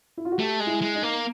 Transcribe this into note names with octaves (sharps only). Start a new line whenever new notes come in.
E4
F4
F#4
A3 G4
G#3
E4
G#3
D#4
A#3